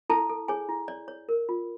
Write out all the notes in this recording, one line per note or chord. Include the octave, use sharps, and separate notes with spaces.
E4 A4 A5
A4
G#4 C#5 G#5
E4
C#5 D5
C#5
A#4
F4